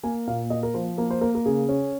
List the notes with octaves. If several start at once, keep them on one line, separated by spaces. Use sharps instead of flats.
A#3 G#5
A#2 F5
A#3 D#5
A#4
F3 C5
A#3 A#4
C5
A#3 A#4
A#4
C#3 G#4
C#4